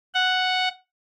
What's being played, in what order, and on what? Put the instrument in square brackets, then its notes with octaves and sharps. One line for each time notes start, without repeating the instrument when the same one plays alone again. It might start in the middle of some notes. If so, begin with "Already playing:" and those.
[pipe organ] F#5